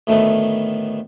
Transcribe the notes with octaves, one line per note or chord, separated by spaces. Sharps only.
D2 A2 D#3 A3 B3